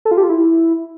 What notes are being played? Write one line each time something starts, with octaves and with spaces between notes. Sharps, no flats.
A4
F4
G4
F4
E4